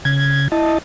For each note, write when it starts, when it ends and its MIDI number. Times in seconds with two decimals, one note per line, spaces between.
0.05 0.48 49
0.05 0.48 92
0.52 0.78 64
0.52 0.78 75
0.52 0.78 81